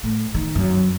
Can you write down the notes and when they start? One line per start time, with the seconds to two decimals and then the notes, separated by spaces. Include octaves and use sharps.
0.03 A2
0.34 D#3
0.55 F#2